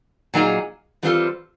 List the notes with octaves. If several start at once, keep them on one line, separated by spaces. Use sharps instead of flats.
A#2 F#3 A#3 D#4 G#4
E3 G3 C4 F4 A4